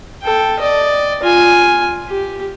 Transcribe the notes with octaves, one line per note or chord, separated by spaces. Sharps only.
A4 G5
D5 D#5
F4 G#5
G4